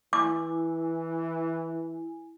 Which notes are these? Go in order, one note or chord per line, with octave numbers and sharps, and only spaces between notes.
E3 E4 G#5 D6